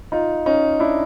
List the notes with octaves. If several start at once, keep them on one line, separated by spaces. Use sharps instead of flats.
D#4 F4
C#4 D#4
D4 E4